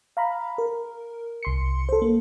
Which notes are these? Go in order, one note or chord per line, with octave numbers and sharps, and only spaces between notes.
F5 A#5 B5
A#4
C2 C6 C#7
A4 C5
A#3